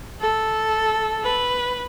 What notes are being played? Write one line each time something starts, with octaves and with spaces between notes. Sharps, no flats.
A4
B4